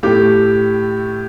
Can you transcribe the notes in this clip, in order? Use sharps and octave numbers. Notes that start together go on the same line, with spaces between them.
A2 A3 G4